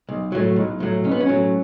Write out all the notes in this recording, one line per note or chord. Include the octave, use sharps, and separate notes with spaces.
B1
A2 F#3
B1
A2 F#3
B1 C#4
B3
C#4
A2 F#3